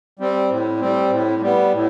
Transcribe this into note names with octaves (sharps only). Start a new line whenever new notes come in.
G3 C4
A2
G3 C4
A2
G3 B3
A2